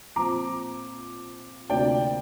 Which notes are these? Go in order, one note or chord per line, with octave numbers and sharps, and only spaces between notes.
A#2 F3 C4 A#5 D6
D2 C3 A#3 D4 F4 D5 G5